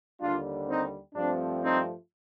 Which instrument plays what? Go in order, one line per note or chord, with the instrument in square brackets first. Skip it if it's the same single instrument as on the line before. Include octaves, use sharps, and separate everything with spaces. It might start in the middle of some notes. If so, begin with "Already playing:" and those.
[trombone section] D#2 D3 G3 D4 F4
C4 D#4
G2 F3 A3 C4 D4
C4 D#4